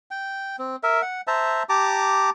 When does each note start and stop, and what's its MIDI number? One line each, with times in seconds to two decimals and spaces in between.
0.11 0.56 79
0.59 0.76 60
0.83 1.01 70
0.83 1.01 76
1.02 1.21 78
1.27 1.63 72
1.27 1.63 76
1.27 1.63 81
1.27 1.63 82
1.69 2.30 67
1.69 2.30 81
1.69 2.30 82
1.69 2.30 86